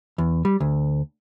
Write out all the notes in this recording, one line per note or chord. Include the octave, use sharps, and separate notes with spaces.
E2
G3
D2